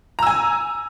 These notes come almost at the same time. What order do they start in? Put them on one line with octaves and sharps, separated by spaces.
A#5 E6 G#5